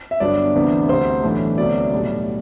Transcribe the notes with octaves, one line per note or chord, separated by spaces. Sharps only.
E5
G1 G2 F#3 B3 D4 D5
D2 C3 E3 B3 D4
D2 C3 G3 C5
B1 A2 E3 A3 D4
D2 C3 F#3 B3 D5
B1 A2 G3